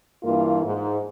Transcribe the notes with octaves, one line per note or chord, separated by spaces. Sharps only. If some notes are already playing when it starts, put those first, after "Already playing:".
G2 E3 A#3 F4
G#2